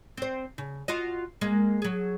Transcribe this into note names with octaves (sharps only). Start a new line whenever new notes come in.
C4 C5
C#3
F4 F#4 D#5
G#3 A#3
F#3 G#4